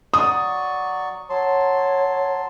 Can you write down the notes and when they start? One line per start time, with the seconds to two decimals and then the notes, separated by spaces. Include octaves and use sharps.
0.14 F#3 D5 C#6 D#6
1.30 F#3 C#5 A5 C6